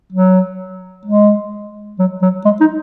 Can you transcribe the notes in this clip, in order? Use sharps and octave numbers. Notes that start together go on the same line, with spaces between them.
F#3
G#3
F#3
F#3
G#3
D#4